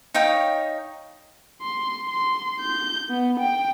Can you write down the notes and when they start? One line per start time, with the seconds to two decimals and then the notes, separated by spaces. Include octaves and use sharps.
0.14 D#4 C#5 F5 G5
1.62 C6
2.09 C6
2.60 G6
3.10 B3
3.40 G5